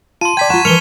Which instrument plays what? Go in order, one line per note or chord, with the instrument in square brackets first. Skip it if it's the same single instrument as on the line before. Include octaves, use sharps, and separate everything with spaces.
[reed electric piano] F4 [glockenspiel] A5 C6 [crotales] D#7
[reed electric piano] D5 G5 [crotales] G#6 B6
[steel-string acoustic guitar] F4 A#5 [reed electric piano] F#5 [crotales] C#6 E7
[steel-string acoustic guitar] E3 G#3 [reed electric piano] A#4 [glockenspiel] F6 C#7 [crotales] F7 G7